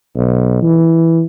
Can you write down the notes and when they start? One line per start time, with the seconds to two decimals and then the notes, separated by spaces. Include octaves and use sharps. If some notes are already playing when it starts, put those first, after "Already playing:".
0.16 B1
0.62 E3